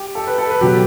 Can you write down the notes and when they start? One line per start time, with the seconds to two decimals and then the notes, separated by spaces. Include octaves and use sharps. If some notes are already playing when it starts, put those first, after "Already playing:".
Already playing: G4
0.15 A4
0.27 B4
0.38 A4
0.50 B4
0.61 B2 F#3 G4